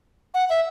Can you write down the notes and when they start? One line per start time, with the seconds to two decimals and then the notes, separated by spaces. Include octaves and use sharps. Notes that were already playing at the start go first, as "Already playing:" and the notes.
0.34 F#5
0.50 E5